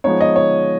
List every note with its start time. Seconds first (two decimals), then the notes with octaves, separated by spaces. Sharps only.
0.04 F3 G#3 B3 D#4 C#5
0.21 D#5
0.36 C#5